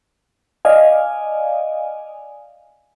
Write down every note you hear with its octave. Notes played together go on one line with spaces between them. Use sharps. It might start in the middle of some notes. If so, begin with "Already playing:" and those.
D5 D#5 F5 G#5